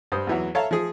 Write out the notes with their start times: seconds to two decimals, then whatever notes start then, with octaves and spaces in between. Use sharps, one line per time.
0.12 G2 C5 D#6
0.27 E2 E3 F#3
0.55 A4 C#5 E5 F5 A#5
0.71 F3 G#4